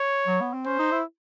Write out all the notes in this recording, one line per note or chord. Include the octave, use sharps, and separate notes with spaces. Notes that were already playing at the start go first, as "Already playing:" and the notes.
Already playing: C#5
F#3
B3
C4
C#4 C5
D#4
E4